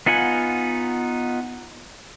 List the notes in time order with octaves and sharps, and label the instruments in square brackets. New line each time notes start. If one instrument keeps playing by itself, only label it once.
[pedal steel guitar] B3 D#4 F4 F#5 G#5